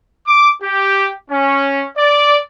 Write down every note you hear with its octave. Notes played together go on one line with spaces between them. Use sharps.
D6
G4
C#4
D5